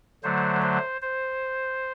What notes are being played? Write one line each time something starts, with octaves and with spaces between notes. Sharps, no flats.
D3 F#3 A3 C5
C5
C5